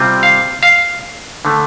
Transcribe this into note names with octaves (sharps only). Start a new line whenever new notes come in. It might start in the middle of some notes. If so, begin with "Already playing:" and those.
Already playing: C3 G3 C4 F4
F5
F5
D3 A3